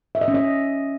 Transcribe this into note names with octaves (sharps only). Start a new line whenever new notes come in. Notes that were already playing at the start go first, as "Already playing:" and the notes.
E5
D#5
C#4
D#5